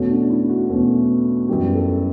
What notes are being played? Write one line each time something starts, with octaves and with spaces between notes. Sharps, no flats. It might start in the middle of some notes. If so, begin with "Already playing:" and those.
Already playing: E2 B2 A3 C#4 F#4
D4
E4
F#4
E2 B2 A3 C#4
F#2 E3 G3 B3 G4
A4